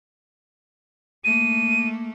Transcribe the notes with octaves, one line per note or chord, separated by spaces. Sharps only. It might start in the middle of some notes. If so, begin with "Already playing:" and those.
A3 A#3 D#7